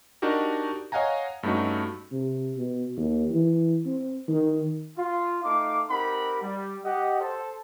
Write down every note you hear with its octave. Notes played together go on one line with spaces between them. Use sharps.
D4 D#4 F#4 G4 A#4
C#5 D#5 F5 F#5 G#5 A#5
G2 A3 C#4 D#4 F#4
C3
B2
D#2
E3
C4
D#3
F4
A3 D#4 F5 D6
C4 D#4 G4 A#4 F#5 B5
G3
G4 D#5 F#5
A4 C5